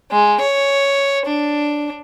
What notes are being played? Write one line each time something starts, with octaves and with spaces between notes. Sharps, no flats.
G#3
C#5
D4